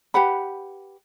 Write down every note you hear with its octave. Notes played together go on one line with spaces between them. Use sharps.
G4 B4 F#5 B5